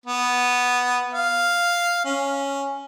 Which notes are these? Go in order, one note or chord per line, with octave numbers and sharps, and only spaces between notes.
B3
F5
C#4